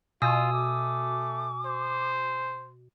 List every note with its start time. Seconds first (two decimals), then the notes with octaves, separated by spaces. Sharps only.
0.22 B2 F4 G#5 D#6 E6
0.52 A3 D6
1.66 C5